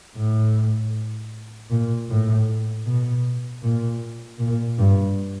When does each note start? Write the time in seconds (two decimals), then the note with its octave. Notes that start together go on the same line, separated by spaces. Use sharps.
0.16 A2
1.70 A#2
2.09 A2
2.86 B2
3.63 A#2
4.39 A#2
4.78 G2